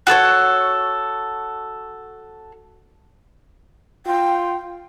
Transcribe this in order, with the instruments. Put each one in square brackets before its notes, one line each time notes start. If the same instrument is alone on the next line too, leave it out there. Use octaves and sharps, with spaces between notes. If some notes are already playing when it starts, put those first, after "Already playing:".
[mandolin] F#4 G#4 A4 C#5
[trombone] F4 [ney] G5